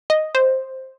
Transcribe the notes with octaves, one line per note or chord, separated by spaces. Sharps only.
D#5
C5